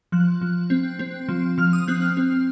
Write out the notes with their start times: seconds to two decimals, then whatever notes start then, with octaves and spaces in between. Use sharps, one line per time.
0.12 F3 F#6
0.41 F3
0.70 C4
0.99 C4
1.29 F3
1.58 F3 F6
1.73 D#6
1.88 C4 F#6
2.02 F6
2.17 C4